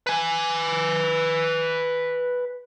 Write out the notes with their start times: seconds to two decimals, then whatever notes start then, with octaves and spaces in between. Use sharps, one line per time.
0.07 B4 G#5